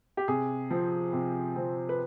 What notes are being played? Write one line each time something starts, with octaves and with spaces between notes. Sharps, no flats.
G4
C3 G#4
F3 C4
C3
F3 C4
B4